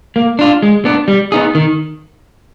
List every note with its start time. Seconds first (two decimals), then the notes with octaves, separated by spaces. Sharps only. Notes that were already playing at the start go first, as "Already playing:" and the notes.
0.16 A#3
0.39 D4 F4
0.62 G#3
0.85 B3 D4
1.08 G3
1.32 B3 D#4 G#4
1.55 D#3